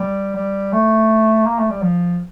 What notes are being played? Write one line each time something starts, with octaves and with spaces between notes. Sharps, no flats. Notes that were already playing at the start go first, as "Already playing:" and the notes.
Already playing: G3
G3
A3
A#3
A3
G3
F3